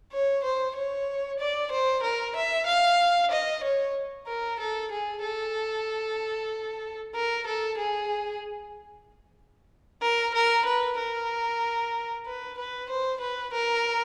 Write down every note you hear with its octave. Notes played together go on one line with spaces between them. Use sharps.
C#5
C5
C#5
D5
C5
A#4
E5
F5
D#5
C#5
A#4
A4
G#4
A4
A#4
A4
G#4
A#4
A#4
B4
A#4
B4
B4
C5
B4
A#4